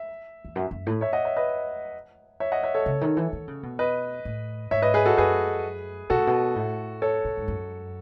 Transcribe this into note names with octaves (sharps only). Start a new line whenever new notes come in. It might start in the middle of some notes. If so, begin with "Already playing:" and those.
Already playing: E5
E2
F#2
F#2
A2
C#5 E5
D#5 F#5
C#5 E5
B4 D#5
C#5 E5
D#5 F#5
C#5 E5
A4 C#5
C#3
D#3
E3
D#3
C#3
B2
B4 D#5
A2
G#2 C#5 E5
B4 D#5
G#4 B4
F#4 A4
F#2 G#4 B4
B2 F#4 A4
A2
B2
A2
A4 C#5
A2
G#2
F#2